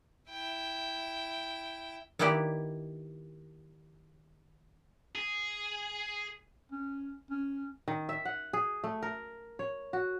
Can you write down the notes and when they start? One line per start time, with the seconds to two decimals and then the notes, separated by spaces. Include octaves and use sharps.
0.31 E4 G5
2.19 D#3 A#3 B3 E4 G4 D5
5.15 G#4
6.72 C#4
7.31 C#4
7.88 D#3
8.09 E5
8.25 F#5
8.53 G#4
8.84 A3
9.03 A#4
9.59 C#5
9.93 F#4